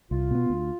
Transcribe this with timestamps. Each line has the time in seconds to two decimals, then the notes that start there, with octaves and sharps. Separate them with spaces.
0.11 C2 F4
0.31 B2 B3
0.50 D2